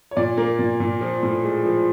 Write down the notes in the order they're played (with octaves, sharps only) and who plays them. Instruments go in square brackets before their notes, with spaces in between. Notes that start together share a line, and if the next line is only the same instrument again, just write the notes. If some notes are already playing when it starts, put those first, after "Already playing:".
[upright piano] C#5
A#2 D5
A#3
A#2
A#2
F3
A2
G#3
F3